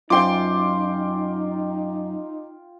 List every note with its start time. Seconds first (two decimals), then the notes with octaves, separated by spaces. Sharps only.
0.10 F#2 D#4 F4 G5 C6 D6